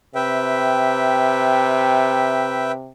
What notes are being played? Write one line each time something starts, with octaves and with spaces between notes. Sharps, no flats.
C3 B4 E5 G5